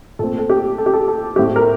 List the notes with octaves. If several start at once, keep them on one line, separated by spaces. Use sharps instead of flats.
A#2 A3 C4 A4
A4
G4
A4
G4
A4
A4
A2 A3 C4 G4
A#4